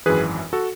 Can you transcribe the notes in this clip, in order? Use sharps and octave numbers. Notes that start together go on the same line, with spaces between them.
G#1 F#2 E3 G#4 B4
F#4 A4